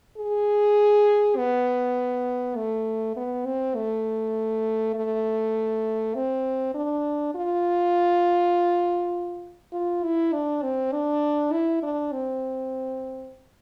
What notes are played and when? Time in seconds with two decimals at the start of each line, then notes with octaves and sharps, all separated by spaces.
0.17 G#4
1.37 B3
2.56 A3
3.16 B3
3.46 C4
3.76 A3
4.95 A3
6.15 C4
6.75 D4
7.35 F4
9.73 F4
10.04 E4
10.33 D4
10.62 C4
10.92 D4
11.52 E4
11.83 D4
12.12 C4